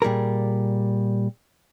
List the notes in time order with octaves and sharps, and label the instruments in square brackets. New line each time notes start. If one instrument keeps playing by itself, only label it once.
[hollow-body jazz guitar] A#2 G3 G#4 A#4